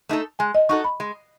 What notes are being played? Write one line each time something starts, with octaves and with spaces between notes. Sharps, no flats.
A3 D#4 A4
G#3 G#5
D#5
D#4 F#4 A4 C#6
B5
G#3